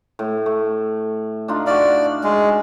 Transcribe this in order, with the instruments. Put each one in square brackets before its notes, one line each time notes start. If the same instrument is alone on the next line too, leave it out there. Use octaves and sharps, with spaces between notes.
[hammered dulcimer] A2
A3
D4 D#4 F4
[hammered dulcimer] F#4 F5 [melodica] D5
[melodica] G#3